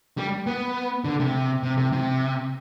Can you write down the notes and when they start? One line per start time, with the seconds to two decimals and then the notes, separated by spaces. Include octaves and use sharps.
0.18 G3
0.47 B3
1.05 D3
1.20 C3
1.63 C3
1.78 C3
1.93 C3